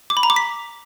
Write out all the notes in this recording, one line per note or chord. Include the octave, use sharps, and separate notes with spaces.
D6
B5
A#5
D6
B6